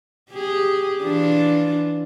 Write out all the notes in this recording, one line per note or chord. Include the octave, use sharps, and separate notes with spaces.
G4 G#4
E3 D4 F4